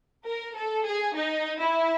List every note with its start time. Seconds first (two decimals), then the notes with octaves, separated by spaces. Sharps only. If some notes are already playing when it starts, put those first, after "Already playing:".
0.24 A#4
0.55 A4
0.86 G#4
1.15 D#4
1.60 E4